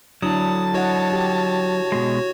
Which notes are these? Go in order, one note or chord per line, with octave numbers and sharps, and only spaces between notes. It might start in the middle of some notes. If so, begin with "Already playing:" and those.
D3 F#3 D4 E4 A5 D#6
E4 F#4 C#5 D#5 F#5
G4
B2 G#3